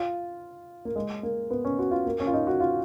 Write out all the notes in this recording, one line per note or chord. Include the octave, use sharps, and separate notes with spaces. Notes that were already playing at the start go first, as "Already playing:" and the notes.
Already playing: F4
A#3
G#3
A#3
B3
C#4
F#4
F4
A#3
C#4
F4
D#4
F#4
F4